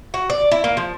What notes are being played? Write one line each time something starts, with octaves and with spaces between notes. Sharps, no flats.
F#4
D5
E4
A#3
F3